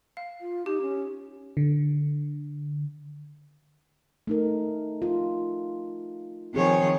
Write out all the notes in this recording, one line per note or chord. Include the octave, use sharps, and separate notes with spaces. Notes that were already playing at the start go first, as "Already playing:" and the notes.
F5
F4
D#4 G4
C#4
D3
A3 D#4 A#4
F4
D#3 F3 C4 G#4 C#5